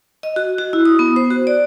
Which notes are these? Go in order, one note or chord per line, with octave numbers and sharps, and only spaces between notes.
D#5
F#4
F#4
E4
D#6
B3
C5
F#4
D5